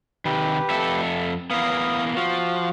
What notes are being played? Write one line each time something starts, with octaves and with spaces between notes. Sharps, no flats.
C3 D#3 G4 B4
F2 A4 E5
E3 A#3 B3 F5 D#6
F3 F4 F#4